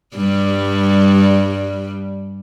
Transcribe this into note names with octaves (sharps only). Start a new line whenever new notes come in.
G2 G3